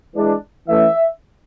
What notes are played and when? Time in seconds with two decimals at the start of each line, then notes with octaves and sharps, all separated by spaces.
0.15 E3 G#3 D4
0.68 E3 A3 C#4 E5